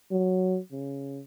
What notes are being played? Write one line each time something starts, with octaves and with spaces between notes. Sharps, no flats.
F#3
C#3